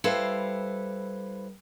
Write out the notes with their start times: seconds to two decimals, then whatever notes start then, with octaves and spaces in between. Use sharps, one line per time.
0.04 G3 E4 A4 B4 C5 F5